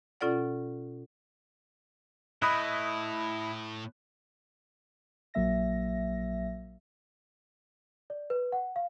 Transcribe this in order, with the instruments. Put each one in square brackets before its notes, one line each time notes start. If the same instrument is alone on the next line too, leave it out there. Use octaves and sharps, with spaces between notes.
[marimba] B2 C#4 F4 A4 D5 F#5
[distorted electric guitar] A2 [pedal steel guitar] E4 D#5 [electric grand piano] B5 D#6 F#6
[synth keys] A#1 F#3 A#3 E5 A#6
[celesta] D5
B4
F#5
F5